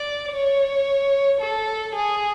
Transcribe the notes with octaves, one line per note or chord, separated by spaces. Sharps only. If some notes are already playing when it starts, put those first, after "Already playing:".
Already playing: D5
C#5
A4
G#4